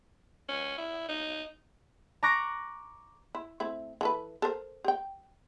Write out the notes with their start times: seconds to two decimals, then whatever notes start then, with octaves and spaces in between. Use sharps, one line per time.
0.49 C#4
0.78 E4
1.09 D#4
2.23 A#5 C#6 D6 F#6 A#6
3.35 E4
3.60 A3 C4 E4
4.01 E3 A4 B4
4.42 A4 A#4 C5
4.84 G4 G5